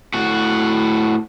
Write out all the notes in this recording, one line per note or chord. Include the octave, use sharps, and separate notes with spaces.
A2 F#4